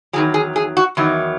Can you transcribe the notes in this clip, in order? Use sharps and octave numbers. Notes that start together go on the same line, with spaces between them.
E2 D#3 F#3 G#4
G#4
G#4
F#4
E2 D#3 F#3